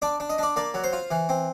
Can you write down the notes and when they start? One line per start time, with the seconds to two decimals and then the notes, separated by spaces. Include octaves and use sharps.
0.02 D4 D5
0.20 D4
0.30 D#5
0.38 D4 D5
0.56 A#3 D5
0.74 F#3
0.84 C5
0.93 F4
1.11 E3
1.29 C4